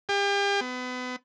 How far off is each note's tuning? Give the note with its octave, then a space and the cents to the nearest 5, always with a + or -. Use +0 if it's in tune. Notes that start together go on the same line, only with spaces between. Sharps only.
G4 +40
B3 +30